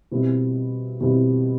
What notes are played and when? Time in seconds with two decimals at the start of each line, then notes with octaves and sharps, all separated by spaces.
0.11 B2 G3 C4 E4
1.00 B2 G3 C4 E4